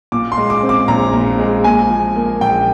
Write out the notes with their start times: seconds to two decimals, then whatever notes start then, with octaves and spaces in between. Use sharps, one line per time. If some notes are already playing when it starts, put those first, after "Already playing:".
0.12 A#2 D6
0.32 C6
0.37 G#3
0.50 D6
0.63 C4
0.69 D6
0.88 A#1 A#5
1.13 A#2
1.39 G#3
1.64 A#2 G#5
1.90 F3
2.15 A#3
2.41 A#1 G5